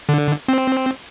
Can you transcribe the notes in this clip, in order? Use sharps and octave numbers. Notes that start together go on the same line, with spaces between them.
D3
C4